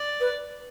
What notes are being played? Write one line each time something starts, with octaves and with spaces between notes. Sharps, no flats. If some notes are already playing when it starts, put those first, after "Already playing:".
Already playing: D5
B4